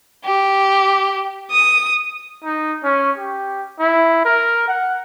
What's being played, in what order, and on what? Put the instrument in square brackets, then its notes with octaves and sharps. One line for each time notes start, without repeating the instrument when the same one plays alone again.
[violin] G4
D#6
[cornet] D#4
C#4
G4
E4
A#4
F#5